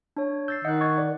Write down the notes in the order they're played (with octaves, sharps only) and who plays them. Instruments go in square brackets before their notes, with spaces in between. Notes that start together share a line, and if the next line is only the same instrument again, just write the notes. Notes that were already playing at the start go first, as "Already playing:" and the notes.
[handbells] D4 C#5
[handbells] E6 A6 C7 [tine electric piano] G6
[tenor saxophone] D#3 [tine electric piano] D#5 [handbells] F#5 F#6
[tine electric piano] C#6 G#6 A6
A#4 D5